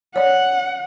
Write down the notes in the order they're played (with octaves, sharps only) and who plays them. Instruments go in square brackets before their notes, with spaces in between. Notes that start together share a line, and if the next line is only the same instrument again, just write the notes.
[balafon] C#5 D5 [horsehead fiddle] F#5